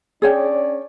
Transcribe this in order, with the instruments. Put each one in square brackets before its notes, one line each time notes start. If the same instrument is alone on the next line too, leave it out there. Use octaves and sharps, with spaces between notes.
[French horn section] C#4 D4 D5 [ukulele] G#4 C#5 G5